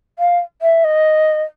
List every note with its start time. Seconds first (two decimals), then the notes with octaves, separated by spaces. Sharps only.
0.18 F5
0.61 E5
0.84 D#5